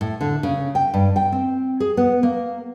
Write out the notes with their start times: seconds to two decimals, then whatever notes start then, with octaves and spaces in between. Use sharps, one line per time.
0.01 A2
0.21 D3
0.43 C#3
0.75 G5
0.94 G2
1.16 G5
1.32 C4
1.80 G#4
1.97 B3
2.23 A#3